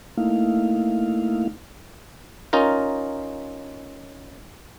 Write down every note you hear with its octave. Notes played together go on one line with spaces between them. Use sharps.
A3 A#3 D#4 E4 F5
C#4 D#4 F4 A#4